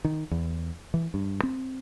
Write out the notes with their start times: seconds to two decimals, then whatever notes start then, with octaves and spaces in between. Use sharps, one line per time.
0.05 D#3
0.31 E2
0.94 E3
1.14 G2
1.43 C4